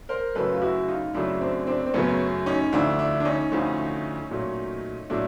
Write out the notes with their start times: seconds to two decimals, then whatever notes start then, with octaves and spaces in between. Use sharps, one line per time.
0.09 A#4 C5
0.35 F#2 C#3 F#3 A3 A4 B4
0.52 F4
0.62 E4 F#4
0.88 D#4 F4
1.14 F#2 C#3 F#3 A3 D4 E4
1.41 C4 D4
1.67 C4 D4
1.86 C4
1.94 F#2 C#3 F#3 A3 B3 C#4
2.46 C#4 D#4
2.72 D2 D3 F3 A3 D4 E4
2.99 D4 E4
3.20 D4
3.25 C#4 D#4
3.52 D2 D3 F3 A3
4.31 A#2 F#3 A3
5.10 A#2 F#3 A3 D4 E4